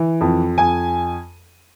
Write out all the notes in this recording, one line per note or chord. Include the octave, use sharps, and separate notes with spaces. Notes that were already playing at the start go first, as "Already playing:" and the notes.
Already playing: E3
F2
F2 G#5